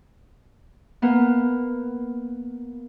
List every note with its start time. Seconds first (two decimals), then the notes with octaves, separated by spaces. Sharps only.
1.02 A#3 B3